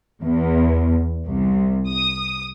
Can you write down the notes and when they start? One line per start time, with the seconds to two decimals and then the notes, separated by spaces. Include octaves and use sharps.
0.22 E2
1.25 C2
1.89 D#6